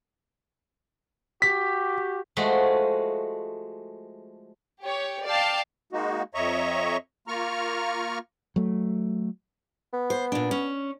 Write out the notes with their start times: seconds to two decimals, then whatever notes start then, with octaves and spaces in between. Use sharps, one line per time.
1.42 F#4 G4 B6
2.37 F3 G#3 A3 F#4
4.83 G4 C#5
5.26 D5 F5 G5 A5 C7
5.93 G#3 A#3 D#4 F#4
6.35 F2 C#5 D#5 E5 A#5 C#6
7.28 A#3 F4 A#5 C#6 F6
8.56 F#3 A3
9.93 B3
10.10 C5
10.32 A#2 D4
10.51 C#4